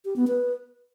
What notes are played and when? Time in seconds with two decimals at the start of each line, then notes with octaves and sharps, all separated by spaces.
0.05 G4
0.16 B3
0.27 B4